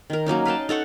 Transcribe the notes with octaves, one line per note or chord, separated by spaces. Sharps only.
D#3 A#4
F#3 A#3 C#4 D#4
B4 F5 G5 A5
D#4 A4 F#5 C#6